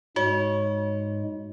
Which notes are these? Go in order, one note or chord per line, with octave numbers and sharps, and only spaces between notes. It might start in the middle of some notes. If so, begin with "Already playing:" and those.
G#2 G#3 F#4 C#5